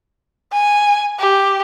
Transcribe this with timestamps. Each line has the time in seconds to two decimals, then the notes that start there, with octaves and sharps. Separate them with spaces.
0.52 G#5
1.19 G4